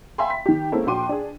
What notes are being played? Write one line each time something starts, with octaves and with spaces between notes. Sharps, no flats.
E5 F5 G5 G#5 B5 C6
B6
D#3 G4
G#3 A#3 C4 C#4 E4 A4
A#1 F#4 G5 C6 D6 D#7
D4 G#4